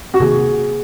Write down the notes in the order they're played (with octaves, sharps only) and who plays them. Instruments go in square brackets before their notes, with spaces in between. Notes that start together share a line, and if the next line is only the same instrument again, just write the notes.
[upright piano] F#4
[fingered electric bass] C3 D#3 A#3 [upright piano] G#4